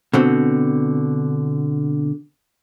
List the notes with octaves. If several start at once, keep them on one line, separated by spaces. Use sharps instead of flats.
B2 D3 C4